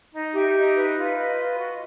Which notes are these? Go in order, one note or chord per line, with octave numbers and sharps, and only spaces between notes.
D#4
G4 E5
D#4
B4
F4
B4 D#5
F4
F#4